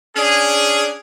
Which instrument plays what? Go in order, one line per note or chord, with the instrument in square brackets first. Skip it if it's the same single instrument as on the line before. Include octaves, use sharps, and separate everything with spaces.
[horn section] C#4 D4 G#4